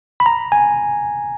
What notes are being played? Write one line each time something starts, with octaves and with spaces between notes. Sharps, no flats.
B5
A#5
G#5